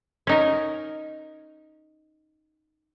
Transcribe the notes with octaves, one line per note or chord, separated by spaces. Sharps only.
C#4 D#4 A#4